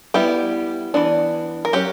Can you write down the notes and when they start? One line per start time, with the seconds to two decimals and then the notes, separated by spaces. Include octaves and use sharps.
0.14 G3 B3 E4 G4
0.94 E3 B3 D4
1.65 A#4
1.73 F#3 C#4 G4